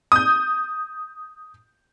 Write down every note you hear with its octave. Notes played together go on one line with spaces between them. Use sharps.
D#6 G6